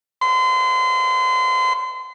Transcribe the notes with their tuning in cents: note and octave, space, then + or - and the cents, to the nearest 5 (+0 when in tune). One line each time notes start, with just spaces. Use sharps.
C6 -35